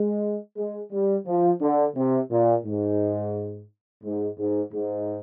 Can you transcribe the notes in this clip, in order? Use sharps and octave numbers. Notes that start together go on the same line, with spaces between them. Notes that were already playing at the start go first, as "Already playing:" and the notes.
Already playing: G#3
G#3
G3
F3
D3
C3
A#2
G#2
G#2
G#2
G#2